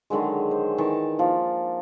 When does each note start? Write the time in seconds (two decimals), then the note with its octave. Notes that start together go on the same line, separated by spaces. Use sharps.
0.10 D3 D#3 F#3 G#3
0.51 C5
0.78 D#3 E3 A5 C#6
1.19 F3 A#3